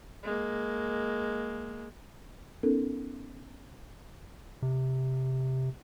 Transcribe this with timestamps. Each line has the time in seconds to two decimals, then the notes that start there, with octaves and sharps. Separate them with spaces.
0.23 G#3 A#3
2.63 B3 C#4 D#4 A4 A#4
4.63 C3